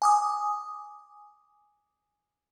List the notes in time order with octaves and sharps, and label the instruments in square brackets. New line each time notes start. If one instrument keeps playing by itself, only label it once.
[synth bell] G#5 D6 D#6